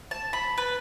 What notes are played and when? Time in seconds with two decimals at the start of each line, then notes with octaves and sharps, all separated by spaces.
0.11 A5
0.33 B5
0.58 B4